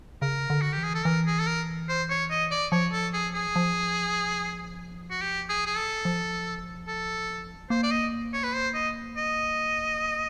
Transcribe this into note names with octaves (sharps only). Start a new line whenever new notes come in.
C#3 A#4
D3
F#4
G4
E3
G#4
A4
E3 A#4
G#4
A4
A#4
C5
C#5
D#5
D5
F3 C#5
A4
G#4
G#4
F3
F#4
G4
G#4
G#4
A4
F3
A4
A#3 C5
D5
D#5
C#5
B4
C5
D#5
D#5